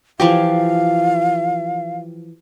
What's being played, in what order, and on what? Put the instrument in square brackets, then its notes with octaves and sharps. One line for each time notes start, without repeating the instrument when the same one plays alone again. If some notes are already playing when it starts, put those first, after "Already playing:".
[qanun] E3 F3 G4 [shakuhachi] F5